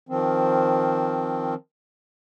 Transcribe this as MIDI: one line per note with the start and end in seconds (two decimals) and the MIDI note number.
0.09 1.54 51
0.09 1.54 53
0.09 1.54 60